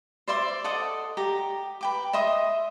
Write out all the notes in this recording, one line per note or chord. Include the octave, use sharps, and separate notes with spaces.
C5 D5 E5 C6
A4 D#5 F#5 D6
G4 A#5 D6
B4 G5 D6
D#5 E5 C6 D#6